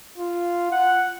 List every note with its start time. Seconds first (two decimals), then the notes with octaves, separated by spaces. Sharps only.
0.18 F4
0.71 F#5